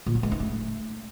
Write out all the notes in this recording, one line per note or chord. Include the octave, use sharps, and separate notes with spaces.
A#2
F#3
G#3
D#4
A3